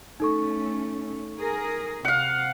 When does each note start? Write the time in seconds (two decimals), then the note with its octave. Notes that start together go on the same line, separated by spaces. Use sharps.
0.20 A3 C#4 D#4 A4 C#6
1.37 G#4 A#4
2.05 C3 F5 F#5